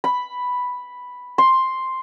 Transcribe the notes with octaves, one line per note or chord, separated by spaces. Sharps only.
B5
C6